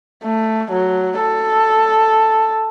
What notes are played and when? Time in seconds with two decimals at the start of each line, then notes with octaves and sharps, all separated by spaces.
0.23 A3
0.71 F#3
1.20 A4